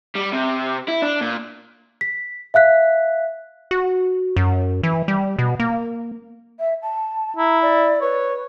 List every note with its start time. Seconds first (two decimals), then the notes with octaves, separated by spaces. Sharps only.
0.16 G3
0.33 C3
0.88 E4
1.02 D4
1.21 A#2
2.01 B6
2.54 E5 F5 F#6 B6
3.71 F#4
4.36 F#2
4.83 E3
5.08 G3
5.39 B2
5.60 A#3
6.59 E5
6.82 A5
7.37 E4 A#5
7.61 D5
8.01 B4 C#5